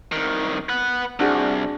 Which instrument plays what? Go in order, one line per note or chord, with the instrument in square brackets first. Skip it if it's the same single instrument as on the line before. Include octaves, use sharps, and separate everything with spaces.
[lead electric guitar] C2 D#3
B4 F#5
[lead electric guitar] C2 [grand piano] D4 F#4 G#4